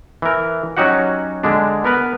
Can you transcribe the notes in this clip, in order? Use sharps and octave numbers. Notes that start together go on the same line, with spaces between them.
E3 A#4
F#3 C#4 D#4 F#4 G4 F#5
D3 G#3 D4
B3 A#4 B4